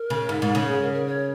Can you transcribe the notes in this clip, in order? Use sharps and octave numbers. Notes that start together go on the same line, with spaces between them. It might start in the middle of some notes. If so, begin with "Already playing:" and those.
Already playing: A#4
C#3
G#2
G#2
C#3
A#4
G#4
A#4
A#4
C#5